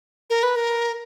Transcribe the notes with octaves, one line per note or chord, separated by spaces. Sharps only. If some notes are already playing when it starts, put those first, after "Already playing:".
A#4
B4
A#4